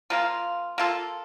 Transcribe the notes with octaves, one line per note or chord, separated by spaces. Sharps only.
F3 A#3 F4
A#3 F4 A4